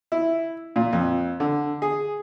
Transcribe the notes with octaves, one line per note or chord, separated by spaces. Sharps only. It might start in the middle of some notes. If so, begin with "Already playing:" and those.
E4
A#2
F2
D3
G#4